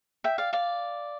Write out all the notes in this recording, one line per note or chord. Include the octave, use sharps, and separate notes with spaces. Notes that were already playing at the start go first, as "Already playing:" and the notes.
E5 G5
D5 F5
D5 F5